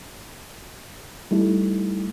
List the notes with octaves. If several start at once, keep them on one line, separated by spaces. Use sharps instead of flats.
G3 A3 D#4 E4